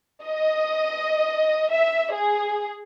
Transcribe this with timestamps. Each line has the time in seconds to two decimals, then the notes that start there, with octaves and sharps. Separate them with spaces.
0.23 D#5
1.71 E5
2.13 G#4